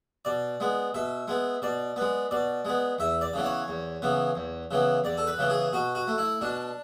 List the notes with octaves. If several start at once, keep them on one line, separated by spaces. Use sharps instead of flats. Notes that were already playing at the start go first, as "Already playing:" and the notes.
B2 D5
G#3 B3
B2 E5
G#3 B3
B2 D5
G#3 B3
B2 D5
G#3 B3
E2 E5
D5
C#3 E3 B3
C#5
E2
C#3 E3 B3
E2
C#3 E3 B3
E2 D5
A4
B4
C#3 E3 B3
G#4
B2 F#4
F#4
A3
E4
B2 D4